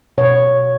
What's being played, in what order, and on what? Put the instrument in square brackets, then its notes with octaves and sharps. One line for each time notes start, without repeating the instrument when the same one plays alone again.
[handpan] B2 C#5